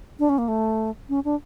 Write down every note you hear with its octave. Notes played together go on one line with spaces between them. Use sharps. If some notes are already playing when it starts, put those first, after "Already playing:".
D4
C#4
A#3
A3
C#4
D4